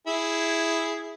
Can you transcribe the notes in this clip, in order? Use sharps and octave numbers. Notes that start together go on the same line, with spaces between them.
E4 G#4